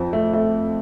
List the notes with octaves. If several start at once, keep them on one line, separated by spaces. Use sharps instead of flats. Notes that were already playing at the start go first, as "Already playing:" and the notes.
Already playing: F2 F3 C5
A3
A3